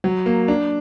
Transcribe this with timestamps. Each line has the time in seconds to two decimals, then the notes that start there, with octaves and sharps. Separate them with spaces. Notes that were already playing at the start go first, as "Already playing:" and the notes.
0.04 F#3
0.26 A#3
0.48 D4